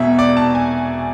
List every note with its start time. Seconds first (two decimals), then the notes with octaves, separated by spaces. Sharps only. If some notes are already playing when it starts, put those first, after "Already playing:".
Already playing: E1 E2 B2 E5
0.19 D5
0.37 A5
0.55 G#5